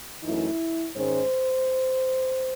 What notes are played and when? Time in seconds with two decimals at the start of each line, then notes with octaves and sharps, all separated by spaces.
0.22 F#2 E3 A3 D#4 E4
0.95 G#2 D#3 G#3 C#4 C5